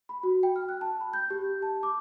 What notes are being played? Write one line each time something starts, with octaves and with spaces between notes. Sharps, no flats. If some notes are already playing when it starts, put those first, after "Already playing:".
B5
F#4
G5
F6
F#6
A5
B5
G6
G4
A5
D6